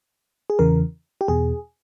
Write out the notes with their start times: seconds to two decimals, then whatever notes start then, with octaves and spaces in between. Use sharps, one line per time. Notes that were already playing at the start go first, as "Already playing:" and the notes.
0.50 G#4
0.59 E2 C#3 E3 A#4
1.21 G4
1.28 E2 B2 G#4